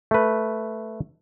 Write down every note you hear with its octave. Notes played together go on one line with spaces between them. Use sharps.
A3 B4